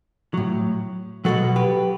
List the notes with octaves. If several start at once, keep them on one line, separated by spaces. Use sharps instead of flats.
A2 F#3
B2 F#3 F#4 A4
G4 B4